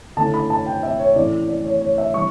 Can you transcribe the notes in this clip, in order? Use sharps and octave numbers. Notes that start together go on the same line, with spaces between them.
D3 A3 C#4 E4 A5
B5
A5
G5
E5
C#5
A2 E3 A3 C#4 E4 D5
D5
C#5
C#5
E5
E3 G3 C#6